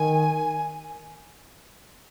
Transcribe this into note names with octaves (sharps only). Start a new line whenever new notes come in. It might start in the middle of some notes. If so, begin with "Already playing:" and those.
Already playing: D#3 G#5